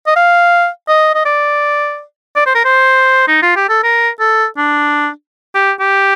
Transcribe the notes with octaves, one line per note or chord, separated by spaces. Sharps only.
D#5
F5
D#5
D#5
D5
D5
C5
A#4
C5
D#4
F4
G4
A4
A#4
A4
D4
G4
G4